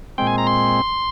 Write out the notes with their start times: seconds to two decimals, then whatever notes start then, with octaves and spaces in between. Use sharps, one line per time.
0.18 A#2 G#3 C4 G5
0.27 G#5
0.38 A#5
0.47 C6